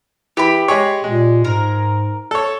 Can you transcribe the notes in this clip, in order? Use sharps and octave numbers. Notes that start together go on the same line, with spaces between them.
E3 G4 B5
G#3 G#4 C#5
A#2 G#3
G#2 A#4
A4 C#5